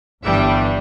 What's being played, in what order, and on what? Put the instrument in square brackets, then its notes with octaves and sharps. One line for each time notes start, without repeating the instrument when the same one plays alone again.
[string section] G1 G2 E3 G3 D4 E5